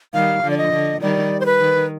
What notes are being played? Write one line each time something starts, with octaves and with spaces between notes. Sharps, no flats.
D#3 G3 F5
D3 F3
D5
D#5
D3
D#3 G3 D5
C5
B4
D#3